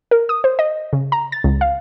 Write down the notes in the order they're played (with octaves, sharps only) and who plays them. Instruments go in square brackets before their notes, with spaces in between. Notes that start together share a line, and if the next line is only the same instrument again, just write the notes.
[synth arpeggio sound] A#4
D#6
C5
D#5
C#3
A#5
A6
C#2
F5